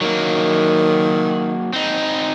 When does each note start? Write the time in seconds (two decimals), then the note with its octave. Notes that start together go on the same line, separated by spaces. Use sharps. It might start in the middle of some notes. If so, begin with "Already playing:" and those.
0.01 D#3 F#3 A#3
1.73 C4 D#4